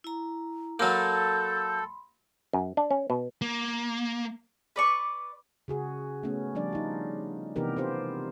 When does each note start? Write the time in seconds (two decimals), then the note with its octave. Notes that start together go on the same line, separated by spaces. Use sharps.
0.04 E4 A#5
0.79 F#3 A#3 A4 B5 C6 G6
2.53 F#2
2.77 D4
2.91 C#4
3.10 B2
3.41 A#3
4.76 B4 D5 C#6
5.68 C#3 F#4 G#4
6.23 A3 B3 C#4
6.55 F3 G3 D4 D5
6.73 D#4 F4
7.56 C3 E3 B3 D#4 G4 A#4
7.77 C4 F4 G4 C5